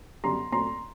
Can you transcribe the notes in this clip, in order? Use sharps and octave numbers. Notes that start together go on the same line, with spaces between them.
F#2 D3 G3 B3 A#5 C6
A#2 F#3 A3 C4 A#5 C6